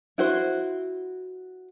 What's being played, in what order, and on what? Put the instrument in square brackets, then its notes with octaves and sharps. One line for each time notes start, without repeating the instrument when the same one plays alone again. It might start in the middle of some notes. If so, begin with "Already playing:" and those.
[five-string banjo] E4 F#4 C5